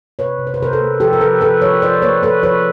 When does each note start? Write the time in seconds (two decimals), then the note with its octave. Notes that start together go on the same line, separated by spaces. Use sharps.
0.19 C3 B4 C#5
0.39 C3
0.47 C5
0.54 B4
0.60 C3 A#4 C5
0.73 A4 B4
0.81 A#3
1.00 F3 G4 A4
1.13 A#4
1.21 F3 A4 B4
1.41 F3 A4 B4
1.62 F3 B4 C#5
1.82 F3 C5 D5
2.02 A#3 B4 C#5
2.23 A#3 A4 B4
2.43 F3 B4 C#5